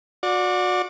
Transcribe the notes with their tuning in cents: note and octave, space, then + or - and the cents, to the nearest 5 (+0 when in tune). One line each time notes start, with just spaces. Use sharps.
F#4 -30 D5 +0